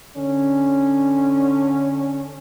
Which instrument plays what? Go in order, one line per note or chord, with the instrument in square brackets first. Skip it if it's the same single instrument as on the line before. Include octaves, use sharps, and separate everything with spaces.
[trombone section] D3 C#4